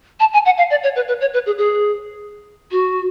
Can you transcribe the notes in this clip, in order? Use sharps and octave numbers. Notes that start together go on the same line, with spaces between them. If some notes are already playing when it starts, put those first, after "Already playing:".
A5
G#5
F#5
F5
D5
C#5
B4
B4
C#5
B4
G#4
G#4
F#4